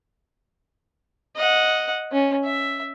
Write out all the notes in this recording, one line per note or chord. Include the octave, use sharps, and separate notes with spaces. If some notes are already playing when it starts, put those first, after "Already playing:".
D#5 F#5
C#4
E5